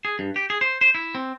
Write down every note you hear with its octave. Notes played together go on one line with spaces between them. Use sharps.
G#4
G2
G4
G#4
C5
C5
E4
C4